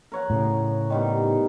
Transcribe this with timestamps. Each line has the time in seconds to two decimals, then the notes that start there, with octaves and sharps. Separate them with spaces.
0.12 A#4 C#5 F#5
0.30 A2 C#3
0.90 D#3 G3 B3